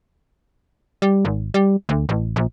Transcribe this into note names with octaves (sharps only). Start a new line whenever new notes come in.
G3
G#1
G3
D2
A1
A#1